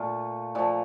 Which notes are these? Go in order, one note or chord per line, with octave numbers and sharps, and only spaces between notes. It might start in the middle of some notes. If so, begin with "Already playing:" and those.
Already playing: A#2 A3 F4
A#2 F3 A3